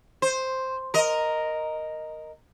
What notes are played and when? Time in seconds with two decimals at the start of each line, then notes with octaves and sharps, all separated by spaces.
0.22 C5
0.94 A#4 D#5